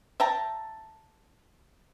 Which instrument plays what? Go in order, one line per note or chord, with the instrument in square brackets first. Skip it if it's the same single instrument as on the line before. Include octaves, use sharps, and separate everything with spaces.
[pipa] E5 G5 A5 A#5